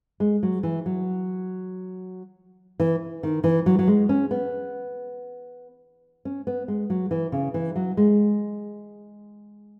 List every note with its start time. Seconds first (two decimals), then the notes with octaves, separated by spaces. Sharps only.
0.20 G#3
0.43 F#3
0.63 E3
0.86 F#3
2.80 E3
3.23 D#3
3.44 E3
3.66 F#3
3.79 F#3
3.87 G#3
4.09 C#4
4.31 B3
6.25 C#4
6.47 B3
6.68 G#3
6.90 F#3
7.11 E3
7.32 C#3
7.54 E3
7.76 F#3
7.97 G#3